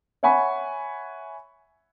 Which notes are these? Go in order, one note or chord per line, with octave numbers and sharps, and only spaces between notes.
C#5 E5 F#5 G#5 B5 C#6